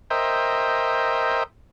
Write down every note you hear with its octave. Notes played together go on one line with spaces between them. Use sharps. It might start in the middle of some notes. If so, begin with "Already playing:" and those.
A#4 C5 D#5 E5 G5